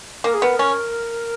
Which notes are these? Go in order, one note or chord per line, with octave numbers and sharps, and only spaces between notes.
A#3 A#4
G#4
B3 A#4
C#4